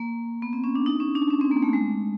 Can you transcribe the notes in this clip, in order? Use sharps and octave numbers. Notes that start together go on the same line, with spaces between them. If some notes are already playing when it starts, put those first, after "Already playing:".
Already playing: A#3
B3
C4
C#4
D4
D#4
C#4
D4
C#4
C4
A#3
A3
G#3